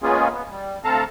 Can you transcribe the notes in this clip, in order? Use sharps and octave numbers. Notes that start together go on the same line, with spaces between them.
G#3 A#3 B3 C#4 F4 G#4
B3
G3
D2 C4 A4 F5 A5 A#5